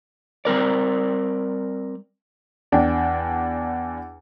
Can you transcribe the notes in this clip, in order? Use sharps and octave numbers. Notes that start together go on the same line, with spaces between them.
G3 C4 A#4 D5
E2 D4 G5